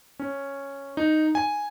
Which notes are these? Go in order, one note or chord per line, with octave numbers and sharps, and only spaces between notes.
C#4
D#4
G#5